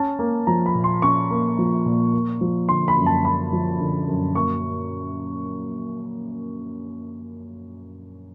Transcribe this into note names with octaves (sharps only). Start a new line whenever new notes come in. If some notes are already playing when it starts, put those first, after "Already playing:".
Already playing: C#4 A5
A#3
F3 A#5
B5
A#2
C6
C#4 C#6
A#3
F3
A#2
A#3
F3
D3 C6
B5
F#2
A5
A#3 B5
F3
D3
F#2
A#3 C#6